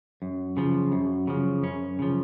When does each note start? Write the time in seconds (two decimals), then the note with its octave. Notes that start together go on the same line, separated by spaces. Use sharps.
0.22 F#2
0.57 C#3 F3
0.92 F#2
1.27 C#3 F3
1.63 F#2 C#4
1.99 C#3 F3